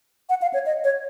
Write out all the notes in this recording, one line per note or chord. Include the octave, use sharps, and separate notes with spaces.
F#5
F5
C#5
D#5
C#5